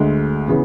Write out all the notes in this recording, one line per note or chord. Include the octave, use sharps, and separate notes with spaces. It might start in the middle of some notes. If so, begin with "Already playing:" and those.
Already playing: D2 D3 G#3
C#3 E3 B3